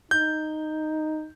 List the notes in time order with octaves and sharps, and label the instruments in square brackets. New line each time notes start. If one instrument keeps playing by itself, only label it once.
[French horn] D#4 [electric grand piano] G6